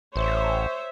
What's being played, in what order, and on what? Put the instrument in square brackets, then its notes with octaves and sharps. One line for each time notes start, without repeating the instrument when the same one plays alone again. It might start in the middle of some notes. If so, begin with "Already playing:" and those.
[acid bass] A1 [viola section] C5 C#5 E5